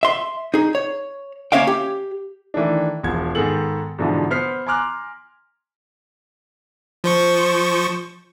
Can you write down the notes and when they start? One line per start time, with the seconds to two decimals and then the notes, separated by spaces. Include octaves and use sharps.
0.03 E5 C6
0.54 D#4 G#4
0.75 C#5
1.52 A#3 C#4 C#5 E5 F5 G5
1.67 G4
2.54 D#3 E3 A3 D4
3.03 E1 E2 F3 G#6
3.35 G#2 D#3 B3 G#4 A4 F#7
3.98 G#2 B2 D3 E3 F3
4.31 B3 C5 F6 B6 C7
4.67 G#5 A#5 C6 D6 F6 F#6
7.04 F3 C5 C#6